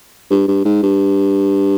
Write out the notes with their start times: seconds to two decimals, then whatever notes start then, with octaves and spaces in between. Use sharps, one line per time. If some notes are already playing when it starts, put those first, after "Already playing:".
0.31 G2
0.48 G2
0.65 G#2
0.83 G2